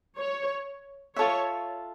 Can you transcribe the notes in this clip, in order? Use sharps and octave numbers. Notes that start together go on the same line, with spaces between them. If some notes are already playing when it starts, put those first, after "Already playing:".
C#5
F4 A4 C#5 E5